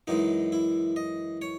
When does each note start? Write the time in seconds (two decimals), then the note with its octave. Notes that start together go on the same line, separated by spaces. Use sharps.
0.07 F#2 E3 G#3 D#4
0.52 E4
0.96 D#5
1.42 C#5